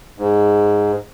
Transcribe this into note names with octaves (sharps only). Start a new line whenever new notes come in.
G#2